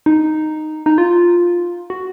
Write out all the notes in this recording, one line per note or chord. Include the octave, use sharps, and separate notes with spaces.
D#4
D#4
F4
F#4